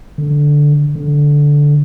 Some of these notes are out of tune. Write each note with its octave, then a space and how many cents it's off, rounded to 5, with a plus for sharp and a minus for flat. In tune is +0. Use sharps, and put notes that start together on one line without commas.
D3 -5
D3 -10